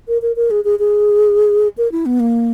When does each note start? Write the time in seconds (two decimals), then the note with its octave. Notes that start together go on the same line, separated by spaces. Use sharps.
0.08 A#4
0.22 A#4
0.36 A#4
0.51 G#4
0.64 G#4
0.79 G#4
1.78 A#4
1.92 E4
2.06 B3
2.20 A#3